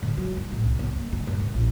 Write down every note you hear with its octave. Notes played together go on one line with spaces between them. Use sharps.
D3
F#3
D#3
A1
C2
B3
A#3
D3
G2
D#2
A#1